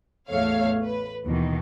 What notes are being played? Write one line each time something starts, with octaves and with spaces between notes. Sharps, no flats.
A1 E2 A3 C#5 F5
B4
D#2 B2 D#3 E3